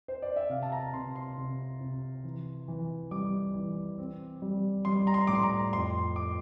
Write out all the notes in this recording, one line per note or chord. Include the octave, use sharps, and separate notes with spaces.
C5
D5
E5
C3 F5
A5
A#5
C3 C6
C6
C3
C3
E3
E3
G3 D6
E3
C4
G3
G3 C6
A#5
C6
A2 D6
C6
A#5
F2 C6
D6